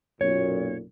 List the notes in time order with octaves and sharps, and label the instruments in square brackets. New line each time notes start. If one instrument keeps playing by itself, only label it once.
[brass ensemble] B1 F#2 A#2 [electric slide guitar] C#5